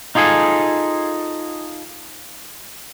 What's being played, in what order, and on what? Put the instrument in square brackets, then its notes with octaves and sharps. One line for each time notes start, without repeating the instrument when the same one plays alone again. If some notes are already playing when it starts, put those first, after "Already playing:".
[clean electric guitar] D#4 F4 G#4 A4 G#5